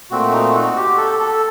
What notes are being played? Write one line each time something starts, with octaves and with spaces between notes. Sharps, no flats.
A#2 A3 C4 F#4
D#4
F#4
G4
A4
A4